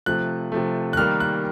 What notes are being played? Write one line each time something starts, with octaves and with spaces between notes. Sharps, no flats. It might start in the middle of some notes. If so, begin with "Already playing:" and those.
C3 F3 A3 F#6
C3 F3 A3
F#6
D#3 G3 A#3 F6
F#6